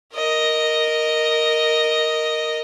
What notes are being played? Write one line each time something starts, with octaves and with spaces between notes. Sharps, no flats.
A#4 D#5